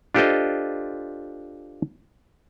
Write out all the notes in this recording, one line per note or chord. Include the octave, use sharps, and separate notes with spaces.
D4 F4 G4 A4 C5 D#5